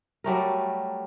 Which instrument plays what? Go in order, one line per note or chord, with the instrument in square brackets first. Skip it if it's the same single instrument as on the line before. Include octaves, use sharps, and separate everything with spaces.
[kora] F#3 G3 A3 A#4